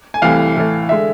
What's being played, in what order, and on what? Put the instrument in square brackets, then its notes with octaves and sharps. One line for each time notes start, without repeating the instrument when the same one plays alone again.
[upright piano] G#5
C2 C3 E3 A3 F5
A2 E3 A3
D3 G#3 E5